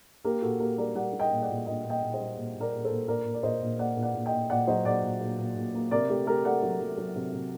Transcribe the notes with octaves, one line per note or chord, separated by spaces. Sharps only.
A#3 G4 A#4
A#2 F#4 A4
A#3 G4 A#4
G3 A#4 D5
G3 D5 F#5
G3
D#5 G5
A#2
D5 F#5
A#2
A#2 D#5 G5
A#2
D#5 G5
A#2
C5 D#5
G3
A#2
A#2
A#4 D5
A#2
A4 C5
A#2
A#2 A#4 D5
A#2
D5
A#2 C5 D#5
A#2
A#3 D5 F#5
A#2
D5 F#5
A#2
D#5 G5
A#2
A#2 D5 F#5
F#3 C5 D#5
A#2 D5 F#5
A#2
A#2
A#2
A#2
A#3
C3 A#4 D5
A3 G4
A3 G4 A#4
A3 D5 F#5
F#3
F#3
F#3
C3
C3